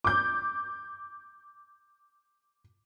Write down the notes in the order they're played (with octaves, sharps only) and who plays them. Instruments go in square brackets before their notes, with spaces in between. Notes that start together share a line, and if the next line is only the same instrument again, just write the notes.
[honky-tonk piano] D6 G6